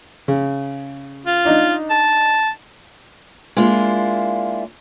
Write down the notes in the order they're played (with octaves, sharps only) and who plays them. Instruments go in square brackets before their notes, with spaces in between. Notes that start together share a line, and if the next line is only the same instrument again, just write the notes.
[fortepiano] C#3
[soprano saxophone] F4
[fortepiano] D4 D#4 D#5
[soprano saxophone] A5
[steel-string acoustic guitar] G#3 A#3 D4 E4 F4